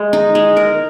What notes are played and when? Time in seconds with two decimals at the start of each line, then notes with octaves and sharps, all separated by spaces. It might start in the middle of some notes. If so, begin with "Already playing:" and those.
Already playing: G#3
0.13 D#4
0.35 G#3
0.57 A#4